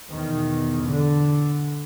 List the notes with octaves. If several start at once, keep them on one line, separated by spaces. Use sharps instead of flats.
E2 B2 D#3
D3